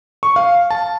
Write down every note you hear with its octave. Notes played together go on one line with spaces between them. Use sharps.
C#6
F5
A5